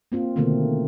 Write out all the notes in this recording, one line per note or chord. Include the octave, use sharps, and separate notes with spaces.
A#3 C4 F4
B2 D3 D#3 A3 A#3 C4